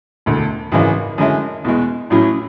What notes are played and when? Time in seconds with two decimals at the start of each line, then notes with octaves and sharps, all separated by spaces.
0.26 E1 D2 D3
0.72 G#1 F#2 C#3 E3 G#3
1.18 F#2 D3 G#3 C#4 E4
1.65 E2 B2 G#3
2.10 A1 A2 F#3 C#4